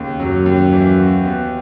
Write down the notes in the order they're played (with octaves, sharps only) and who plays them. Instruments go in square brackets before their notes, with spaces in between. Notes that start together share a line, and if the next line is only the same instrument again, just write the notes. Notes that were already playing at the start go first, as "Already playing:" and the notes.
Already playing: [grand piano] D#2 C#3
[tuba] F#2 [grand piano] F#3
[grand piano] D#2
E3
F#4
B3